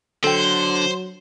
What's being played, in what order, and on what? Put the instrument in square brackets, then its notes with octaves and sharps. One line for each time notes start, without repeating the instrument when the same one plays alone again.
[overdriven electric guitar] D3 [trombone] F#3 [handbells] A4 G5 [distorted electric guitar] C5